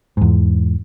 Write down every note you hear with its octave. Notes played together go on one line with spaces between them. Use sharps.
E2 G#2